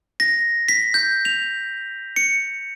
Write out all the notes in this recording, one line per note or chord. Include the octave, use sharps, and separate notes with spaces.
A#6
B6
G6
F7
C#7